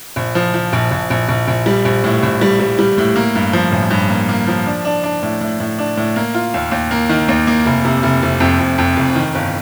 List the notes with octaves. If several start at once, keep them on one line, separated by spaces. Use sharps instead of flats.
A#1
F3
F3
A#1
A#1
A#1
A#1
A#1
G3
A#1
A2
A#1
G3
G3
G3
A2
A#3
G2
F3
A1
G2
A#3
A#3
F3
D4
D4
D4
A2
A2
A2
D4
A2
A#3
F4
D#2
D#2
A#3
D#3
D#2
A#3
F1
C3
F1
F1
F2
F2
F2
F1
D#3
G1